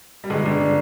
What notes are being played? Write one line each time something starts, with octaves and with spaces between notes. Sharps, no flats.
G3
G1 G#3
G1 D4
D4